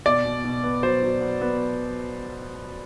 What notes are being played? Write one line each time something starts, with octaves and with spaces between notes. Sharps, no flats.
B2 D5
B2
B2
B3
F#3 C5
F#3
B3
B3